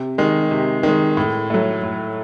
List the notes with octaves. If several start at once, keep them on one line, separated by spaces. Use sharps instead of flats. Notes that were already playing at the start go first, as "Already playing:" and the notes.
Already playing: C3
D#3 G#3
C3
D#3 G#3
A2
F#3 A3
A2